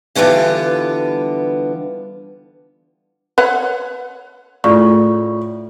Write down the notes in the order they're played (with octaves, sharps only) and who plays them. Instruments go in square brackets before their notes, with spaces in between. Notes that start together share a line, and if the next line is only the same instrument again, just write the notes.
[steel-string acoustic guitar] D3 E3 G3 B3 C#4 F4
[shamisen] B4 C#5 F#5
[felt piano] A2 [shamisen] C#3 [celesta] F4 D5 C#6